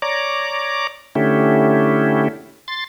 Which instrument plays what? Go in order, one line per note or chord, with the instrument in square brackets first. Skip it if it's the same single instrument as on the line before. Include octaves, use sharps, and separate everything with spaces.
[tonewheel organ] C#5 D5 A#5 D6
D3 A3 C#4 E4 G4
C6 A6